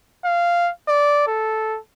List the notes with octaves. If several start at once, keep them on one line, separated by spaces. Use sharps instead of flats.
F5
D5
A4